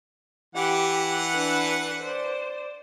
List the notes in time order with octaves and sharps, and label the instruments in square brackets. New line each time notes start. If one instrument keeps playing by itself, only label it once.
[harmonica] E3 F#5 [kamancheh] G4
[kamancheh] D4 B4
C5 D5